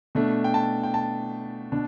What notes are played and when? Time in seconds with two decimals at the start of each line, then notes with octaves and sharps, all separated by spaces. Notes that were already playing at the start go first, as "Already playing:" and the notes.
0.15 B2 A3 D4
0.44 G5
0.54 A5
0.83 G5
0.94 A5
1.72 B2 D4